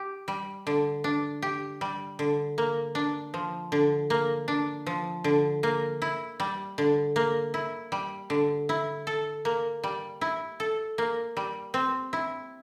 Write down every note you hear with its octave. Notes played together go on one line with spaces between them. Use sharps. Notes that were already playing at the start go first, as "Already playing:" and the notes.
Already playing: G4
G3
D3
D4
G4
G3
D3
A#3
D4
F3
D3
A#3
D4
F3
D3
A#3
E4
G3
D3
A#3
E4
G3
D3
E4
A4
A#3
G3
E4
A4
A#3
G3
C4
E4